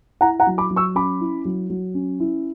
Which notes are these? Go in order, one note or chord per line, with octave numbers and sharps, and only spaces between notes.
E4 F#5 A#5
F#5 A#5
F#3
B5 D6
F#3
C#6 E6
C#4 B5 D6
E4
F#3
F#3
C#4
E4